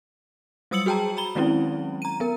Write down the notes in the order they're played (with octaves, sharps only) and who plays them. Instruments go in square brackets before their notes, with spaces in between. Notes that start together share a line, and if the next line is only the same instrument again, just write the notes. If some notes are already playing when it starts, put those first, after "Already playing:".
[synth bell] F#3 G3 D#6 E6 C#7 F#7
F#4 G#4 G5 A5 A#5
A#5 B5 G7
D#3 F#3 G#3 C4 C#4 E4
A#5 D#7
B3 A#4